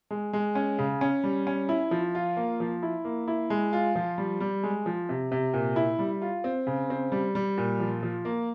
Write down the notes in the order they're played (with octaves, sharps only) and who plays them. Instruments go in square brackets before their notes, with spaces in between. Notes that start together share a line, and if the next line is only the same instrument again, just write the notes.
[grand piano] G#3
G#3
C#4
C#3
C#4
G3
C#4
E4
F3
F4
A#3
F3
E4
A#3
E4
G#3
F4
F3
G3
G3
G#3
F3
C3
C3
A#2
E4
G3
F4
C4
C#3
C4
G3
G3
A#2
F3
F3
A#3